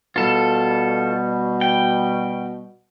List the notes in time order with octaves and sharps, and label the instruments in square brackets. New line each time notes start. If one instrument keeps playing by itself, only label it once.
[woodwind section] B2 G3 [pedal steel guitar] F4 A4
[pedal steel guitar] G5